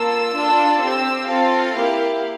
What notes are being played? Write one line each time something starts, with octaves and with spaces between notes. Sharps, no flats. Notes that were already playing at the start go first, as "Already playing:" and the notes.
Already playing: A#3 F4 A4 E6
D4 F4 A4
C4 G4 E6
C4 F4 A4 F5
A#3 E4 G4